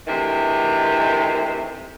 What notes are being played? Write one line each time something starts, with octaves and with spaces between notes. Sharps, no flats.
D2 C3 D#3 E3